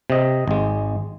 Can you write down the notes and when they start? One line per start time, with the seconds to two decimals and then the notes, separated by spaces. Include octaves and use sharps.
0.10 C3 D#5
0.48 G#1 G#3